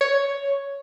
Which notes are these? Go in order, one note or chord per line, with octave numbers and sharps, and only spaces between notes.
C#5